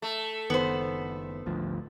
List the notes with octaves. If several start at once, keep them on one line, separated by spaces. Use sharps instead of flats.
A3
F#1 D#3 B3 C5
G#1 D2 F3